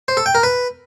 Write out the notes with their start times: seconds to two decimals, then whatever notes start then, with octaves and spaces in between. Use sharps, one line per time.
0.08 C5
0.17 A4
0.26 G5
0.35 A#4
0.43 B4